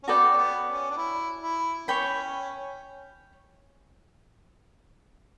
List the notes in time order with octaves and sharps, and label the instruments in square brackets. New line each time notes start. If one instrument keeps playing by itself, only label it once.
[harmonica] C#4
[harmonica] B3 [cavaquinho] F#4 A4 D5 G5
[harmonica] C#4
B3
C#4
D4
E4
E4
[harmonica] C#4 [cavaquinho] C#5 G5 B5